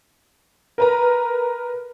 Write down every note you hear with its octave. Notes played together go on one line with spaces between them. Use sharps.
A#4 B4 A#5